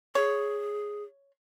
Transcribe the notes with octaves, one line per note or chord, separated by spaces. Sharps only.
G#4 C#5